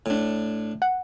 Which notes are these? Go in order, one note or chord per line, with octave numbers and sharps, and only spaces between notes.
A2 D4
F#5